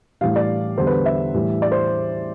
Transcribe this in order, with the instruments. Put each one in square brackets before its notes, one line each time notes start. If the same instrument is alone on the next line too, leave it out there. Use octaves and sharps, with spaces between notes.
[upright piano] A2 E3 G3 F5
D5
E2 D3 G3 C5
B4
E5
A2 E3 G3
D5
C5